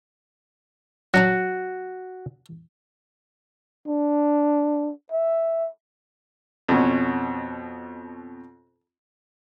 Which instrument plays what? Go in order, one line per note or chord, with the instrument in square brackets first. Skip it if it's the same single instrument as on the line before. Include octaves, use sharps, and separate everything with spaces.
[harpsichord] F#3 D4 A#5 [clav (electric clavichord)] F#4
[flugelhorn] D4
E5
[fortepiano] F2 B2 C#4